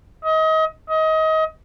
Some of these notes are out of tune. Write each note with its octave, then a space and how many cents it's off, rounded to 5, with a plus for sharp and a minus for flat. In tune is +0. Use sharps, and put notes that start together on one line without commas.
D#5 +30
D#5 +25